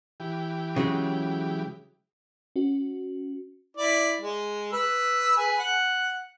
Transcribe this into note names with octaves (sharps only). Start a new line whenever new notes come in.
E3 G4
C#3 F#3 G#3
C#4 F#4
E4 D5
G#3
B4 E6
G#4 B4 G#5
F#5